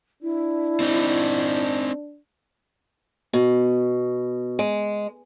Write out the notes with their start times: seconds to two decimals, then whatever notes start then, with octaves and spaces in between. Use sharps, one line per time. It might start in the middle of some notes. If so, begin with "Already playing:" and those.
0.23 D4 E4
0.80 C4 D#4
3.33 B2
4.59 G#3